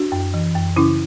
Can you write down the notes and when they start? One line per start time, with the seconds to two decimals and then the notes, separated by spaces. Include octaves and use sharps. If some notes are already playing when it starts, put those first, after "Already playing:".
Already playing: D4 F#4
0.12 F#2
0.34 E3
0.55 F#2
0.76 C#3 C#4 E4